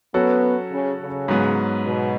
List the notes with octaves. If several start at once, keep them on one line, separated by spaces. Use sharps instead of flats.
F#3 B3 C#4 F#4 A4
C#3
C#3
G#2 F#3 B3
B2